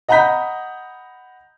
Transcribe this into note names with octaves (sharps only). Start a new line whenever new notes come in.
D#5 F#5 A#5 B5 G6 B6